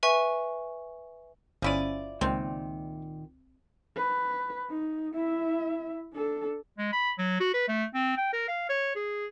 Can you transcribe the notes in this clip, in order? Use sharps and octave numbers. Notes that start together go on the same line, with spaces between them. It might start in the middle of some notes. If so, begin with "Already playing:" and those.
B4 E5 G#5 C#6
G1 F3 C#4 E4 D5 D#7
C#2 A#2 D#3 C4
B4
D#4
E4 E5
D4 A4
G#3
B5
F#3
F#4
B4
A3
C4
G5
A#4
F5
C#5
G#4